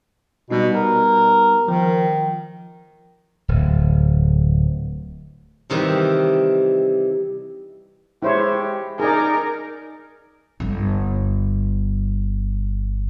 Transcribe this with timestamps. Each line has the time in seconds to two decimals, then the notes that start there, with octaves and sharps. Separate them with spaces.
0.50 B2 G3 B3 D#4
0.75 A#4
1.68 D#3 F3
3.48 D1
5.70 C3 D#3 E3 G3
8.22 G#3 E4 G4 C5 C#5
9.00 D#4 G#4 A#4 D5
10.60 G1 G3